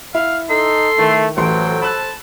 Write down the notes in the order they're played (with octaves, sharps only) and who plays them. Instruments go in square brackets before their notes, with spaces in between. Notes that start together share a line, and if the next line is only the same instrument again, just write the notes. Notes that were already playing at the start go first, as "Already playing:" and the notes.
[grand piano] E4 [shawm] F5
[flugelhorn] D#4 [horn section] A4 [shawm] C6
[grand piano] D#3 E4 [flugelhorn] A3
[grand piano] A1 E3 C6 [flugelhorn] F#3 [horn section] A4 C5 [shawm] G5
[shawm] A5 [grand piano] B5 E6 F#6